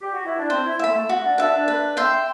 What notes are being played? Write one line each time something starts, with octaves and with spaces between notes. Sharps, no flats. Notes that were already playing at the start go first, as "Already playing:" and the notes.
G4
F#4
E4
D4
C4 C5
E4
A3 E5 B5
A3
F#4
D4
D4 B4 E5
D4
B4
E5 G5 C6